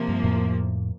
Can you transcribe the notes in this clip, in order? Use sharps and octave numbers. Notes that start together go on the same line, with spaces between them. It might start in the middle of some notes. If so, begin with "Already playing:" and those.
Already playing: C3 F3 A#3
G2
F2 A2